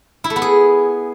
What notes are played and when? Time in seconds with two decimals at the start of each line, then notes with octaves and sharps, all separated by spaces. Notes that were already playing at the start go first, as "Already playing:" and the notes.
0.24 E4
0.30 A3
0.36 B3
0.42 G#4